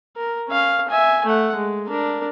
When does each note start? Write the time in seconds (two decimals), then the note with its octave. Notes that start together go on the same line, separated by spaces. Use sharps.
0.17 A#4
0.48 C#4 F5
0.89 E5 G#5
1.26 A3 F#5
1.55 G#3
1.88 D4 A#4